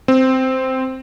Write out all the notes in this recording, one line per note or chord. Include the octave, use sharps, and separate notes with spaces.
C4